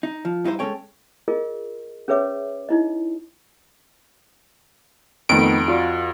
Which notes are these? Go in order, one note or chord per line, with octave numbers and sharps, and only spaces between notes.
D#4
F3
G2 D#4 E4 F#4 C5
G#3 C#4 A4 C#5 G5
F4 G#4 A#4 D#5
C#4 G#4 B4 C#5 E5 D6
D#4 E4 D#5
F2 D#3 A3 B3 D7
F4 F#4 D5